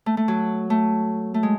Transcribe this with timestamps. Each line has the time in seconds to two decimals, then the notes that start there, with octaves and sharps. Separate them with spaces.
0.06 A3
0.17 A3
0.28 F#3
0.70 A3
1.34 A3
1.43 G#3